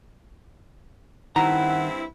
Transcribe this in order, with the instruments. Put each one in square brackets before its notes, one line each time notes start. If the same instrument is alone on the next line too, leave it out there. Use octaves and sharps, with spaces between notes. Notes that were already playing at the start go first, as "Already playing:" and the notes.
[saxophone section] G2 C4 E4 [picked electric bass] D#3 [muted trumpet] F#5 [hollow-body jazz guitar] A#5